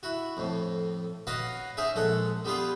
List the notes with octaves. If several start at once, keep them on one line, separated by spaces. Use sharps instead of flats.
E4 F#4
F2 A2
F#4 B4 C#5 D#5 F5 F#5
C#4 D#4 G#4 E5
A#1 G#3 A4 F#5
G3 B3 F4 G4 G#4